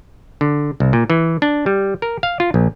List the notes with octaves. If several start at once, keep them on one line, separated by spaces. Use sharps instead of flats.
D3
C2
A#2
E3
D4
G3
A#4
F5
F4
A#1